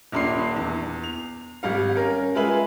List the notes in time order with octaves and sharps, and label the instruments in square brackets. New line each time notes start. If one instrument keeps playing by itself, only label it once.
[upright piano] D#1 A#1 D4 B5 C6 C7
E2
F7
G#1 G3 F5
C#4 A#4
G#3 F4 G#4 B4 E5 F#7